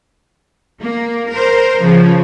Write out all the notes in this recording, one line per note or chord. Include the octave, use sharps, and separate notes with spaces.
A#3
A#4 C5
C#3 F3